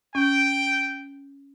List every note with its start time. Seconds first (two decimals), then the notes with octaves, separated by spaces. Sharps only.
0.15 C#4 G5